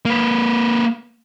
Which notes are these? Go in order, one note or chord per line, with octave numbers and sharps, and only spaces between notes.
A#3 B4